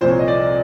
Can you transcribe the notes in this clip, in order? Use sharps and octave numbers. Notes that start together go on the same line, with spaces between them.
C2 A#2 F3 C5
C#5
D#5
D5